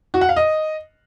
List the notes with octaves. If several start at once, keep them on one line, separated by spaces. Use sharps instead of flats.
F#4
F#5
F5
D#5